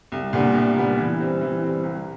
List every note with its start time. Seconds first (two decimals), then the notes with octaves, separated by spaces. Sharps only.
0.12 C2
0.33 A#2 G3 B3 D4
0.55 C2
0.76 A#2 G3 B3 D4
0.98 E3
1.19 G3 C4
1.41 E3
1.63 G3 C4
1.83 C2